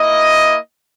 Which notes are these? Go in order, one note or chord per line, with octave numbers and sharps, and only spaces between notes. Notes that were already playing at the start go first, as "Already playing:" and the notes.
Already playing: A#3 E4 D#5